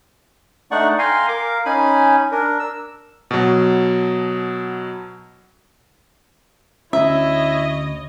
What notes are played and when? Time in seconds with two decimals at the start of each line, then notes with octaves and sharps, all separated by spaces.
0.71 A3 D4 D#4 D5 F#5 C#6
0.99 F5 G5 G#5 A#5 C6
1.28 A#4 F5 D6
1.65 C#4 D#4 G#5 B5
2.32 D4 A#4
2.59 E6
3.31 B2 F#3
6.93 D2 C#4 E4 C#5 D#5 E5